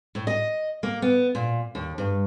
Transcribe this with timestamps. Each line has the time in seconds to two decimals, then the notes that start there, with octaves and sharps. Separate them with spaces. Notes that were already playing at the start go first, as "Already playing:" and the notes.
0.15 A2
0.27 D#5
0.83 A#3
1.02 B3
1.35 A#2
1.75 D#2
1.98 G2